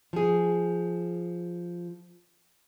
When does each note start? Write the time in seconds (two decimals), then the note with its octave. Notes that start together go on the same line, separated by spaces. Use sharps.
0.13 F3 G#4